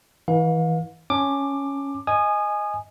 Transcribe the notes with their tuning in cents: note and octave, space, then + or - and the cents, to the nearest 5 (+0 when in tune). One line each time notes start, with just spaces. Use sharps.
E3 -30 F5 +40
C#4 +0 A5 +0 D6 +15
D#5 +0 G#5 +0 D#6 -25